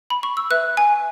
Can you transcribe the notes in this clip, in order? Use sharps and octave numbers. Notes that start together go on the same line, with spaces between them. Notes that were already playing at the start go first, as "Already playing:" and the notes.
B5
C#6
E6
B4 E5 F#6
G#5